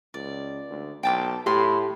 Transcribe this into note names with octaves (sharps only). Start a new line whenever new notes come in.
C#2 D5
D2
B1 G5 A5 D6
A2 G4 A5 B5 C6